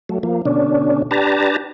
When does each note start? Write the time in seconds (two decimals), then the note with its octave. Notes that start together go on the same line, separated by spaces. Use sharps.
0.09 F#3 A3
0.23 F3 A#3
0.45 B2 D3 C#4 D4
1.11 D4 G4 B4 A5 A#5